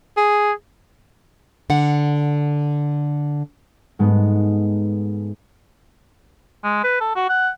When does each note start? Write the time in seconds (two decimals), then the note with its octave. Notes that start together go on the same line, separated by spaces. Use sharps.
0.17 G#4
1.70 D3 F#5
3.99 G#2 G#3 A3 B3
6.64 G#3
6.84 B4
7.00 A4
7.15 F#4
7.29 F#5